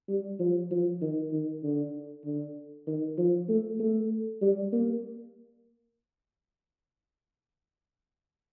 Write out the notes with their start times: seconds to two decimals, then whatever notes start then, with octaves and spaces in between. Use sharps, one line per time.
0.08 G3
0.40 F3
0.71 F3
1.02 D#3
1.32 D#3
1.63 D3
2.25 D3
2.87 D#3
3.18 F3
3.49 A3
3.80 A3
4.42 G3
4.73 A#3